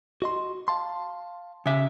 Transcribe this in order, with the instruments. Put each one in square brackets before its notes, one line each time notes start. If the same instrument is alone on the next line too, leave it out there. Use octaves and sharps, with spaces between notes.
[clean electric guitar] F#4 D#5 C6
F5 A5 C6
[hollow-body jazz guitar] C#3 E5